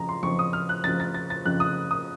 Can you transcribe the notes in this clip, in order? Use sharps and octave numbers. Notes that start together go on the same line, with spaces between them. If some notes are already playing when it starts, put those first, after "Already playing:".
Already playing: F2 C#3 F3 A#5
C6
F2 C#3 F3 C#6
D#6
F6
F#6
F2 C#3 F3 A6
A6
A6
A6
F2 C#3 F3 F#6
D#6
D#6